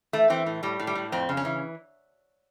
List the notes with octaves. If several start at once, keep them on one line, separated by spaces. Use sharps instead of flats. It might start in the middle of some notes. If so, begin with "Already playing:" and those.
E3 A3
E3 C4
A2
A2 G3
A2
G3
A2
F2 C4
C#3
C#4
E3